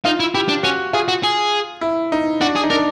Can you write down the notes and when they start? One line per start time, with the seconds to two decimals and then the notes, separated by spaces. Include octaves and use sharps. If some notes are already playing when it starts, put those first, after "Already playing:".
0.05 D#4 F4
0.20 E4
0.34 E4 G4
0.48 D4
0.63 C#4 F#4
0.93 F4 G#4
1.08 F#4
1.23 G#4
1.81 E4
2.12 D#4
2.41 D4 F#4
2.55 G#4
2.64 D#4
2.70 D4 A#4